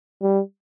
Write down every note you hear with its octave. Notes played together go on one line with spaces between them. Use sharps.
G3